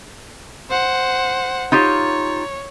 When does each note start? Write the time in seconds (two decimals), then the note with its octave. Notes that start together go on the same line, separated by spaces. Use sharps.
0.70 C5 F#5
1.72 D#4 F4 G4 C#5